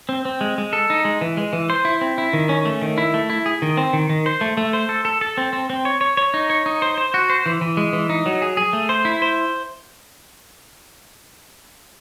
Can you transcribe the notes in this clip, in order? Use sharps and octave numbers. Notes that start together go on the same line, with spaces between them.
C4
C4
G#3
G#3
A4
D#4
G#3
E3
G#3
E3
C5
E4
C4
E4
D#3
C#4
A3
D#3
E4
A3
E4
G#4
D#3
C4
D#3
D#3
C5
A3
A3
C5
A4
A4
A4
C4
C4
C4
C#5
C#5
C#5
D#4
C#5
D#4
C5
C5
F#4
C5
E3
E3
G#3
E3
D#4
F#3
G#4
G#4
A3
C5
E4
C5